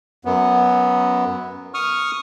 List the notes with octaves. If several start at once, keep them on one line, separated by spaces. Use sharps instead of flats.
F#2 B3
C#6 D#6 F6